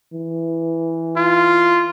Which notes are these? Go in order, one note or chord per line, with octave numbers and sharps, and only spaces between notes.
E3
F4